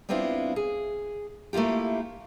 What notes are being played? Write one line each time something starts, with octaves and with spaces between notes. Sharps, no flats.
G3 B3 C4 D4 E4 F4
G#4
A3 A#3 E4 F4 G4